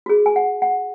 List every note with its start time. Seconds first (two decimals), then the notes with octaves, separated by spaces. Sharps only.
0.06 F#4
0.09 G#4
0.26 G#5
0.36 F#5
0.62 F#5